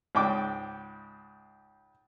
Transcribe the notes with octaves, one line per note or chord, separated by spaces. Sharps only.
C#2 G#2 G5 D6